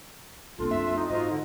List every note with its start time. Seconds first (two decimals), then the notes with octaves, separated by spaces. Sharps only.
0.59 B1 A#3 C4 D4 F4 A4
0.71 F#2 E5
0.97 D#4
1.10 G#2 E3 F4 F#4 C5 D#5
1.30 D3